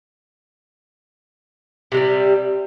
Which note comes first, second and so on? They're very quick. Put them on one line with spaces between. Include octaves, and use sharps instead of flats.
C3 G#3 G3